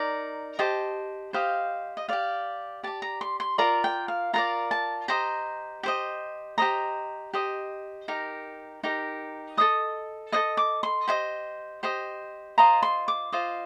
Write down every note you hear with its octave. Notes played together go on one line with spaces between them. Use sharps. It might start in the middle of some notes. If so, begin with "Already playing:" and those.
Already playing: D#4 A#4 D5
G4 C5 D#5 A5
G4 C5 D#5 F5
D#5
G4 D5 F5
G4 D5 A5
A#5
C6
C6
F4 A#4 D5 A#5
G5
F5
F4 A#4 D5 A#5
A5
G4 C5 D#5 A#5
G4 C5 D#5
G4 C5 D#5 A#5
G4 C5 D#5
D#4 G4 A#4
D#4 G4 A#4
A4 C5 D#5 D#6
A4 C5 D#5 D#6
D6
C6
G4 C5 D#5
G4 C5 D#5
F4 C5 D#5 A#5
C6
D6
F4 C5 D#5